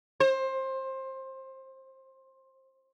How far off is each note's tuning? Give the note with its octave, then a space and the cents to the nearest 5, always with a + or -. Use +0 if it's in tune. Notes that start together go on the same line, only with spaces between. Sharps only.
C5 +20